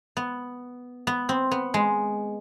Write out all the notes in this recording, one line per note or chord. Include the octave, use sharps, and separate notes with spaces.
B3
B3
C4
B3
G#3